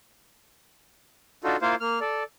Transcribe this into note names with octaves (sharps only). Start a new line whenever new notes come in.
D4 D#4 F4 F#4 A4
A#3 E4 F4 A#4 C5 F5
A#3 F6
A4 D5